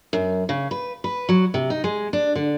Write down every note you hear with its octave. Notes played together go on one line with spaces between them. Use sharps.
F#2
C#3
B4
B4
F#3
C3
D#4
G#3
D4
D3